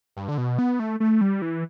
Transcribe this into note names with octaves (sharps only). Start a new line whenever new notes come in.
G2
D3
B2
B3
A3
A3
G3
E3